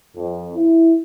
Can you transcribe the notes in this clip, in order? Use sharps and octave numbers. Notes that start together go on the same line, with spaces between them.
F2
E4